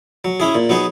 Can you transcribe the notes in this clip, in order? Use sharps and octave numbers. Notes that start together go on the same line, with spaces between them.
F#3
C#4 E4 G#4
A#2
F#3 B3 D#4 G#4